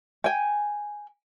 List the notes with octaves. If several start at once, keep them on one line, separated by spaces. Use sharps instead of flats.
G5 G#5